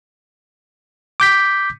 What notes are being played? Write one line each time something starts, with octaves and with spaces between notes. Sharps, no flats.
D6 G6 B6